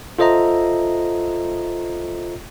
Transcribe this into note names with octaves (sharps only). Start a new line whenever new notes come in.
F4 A4 C5 D#5 E5 A#5